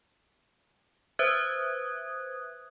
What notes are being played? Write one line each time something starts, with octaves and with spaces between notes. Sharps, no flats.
B4 C5 E5 D#6 F#6 G#6